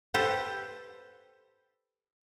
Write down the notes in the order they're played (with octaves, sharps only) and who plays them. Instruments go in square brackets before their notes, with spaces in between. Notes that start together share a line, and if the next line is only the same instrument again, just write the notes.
[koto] G4 A4 B4 C5